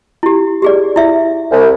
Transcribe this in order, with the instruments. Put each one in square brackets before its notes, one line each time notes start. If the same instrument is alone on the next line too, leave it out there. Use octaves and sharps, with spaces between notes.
[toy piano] E4 G4
G4 G#4 D5
E4 E5
[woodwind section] C2